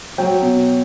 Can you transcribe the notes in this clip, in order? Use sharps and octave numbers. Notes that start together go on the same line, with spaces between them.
F#3 G5
B2